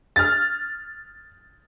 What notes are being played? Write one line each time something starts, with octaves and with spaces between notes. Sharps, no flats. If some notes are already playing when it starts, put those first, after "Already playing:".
F6 A6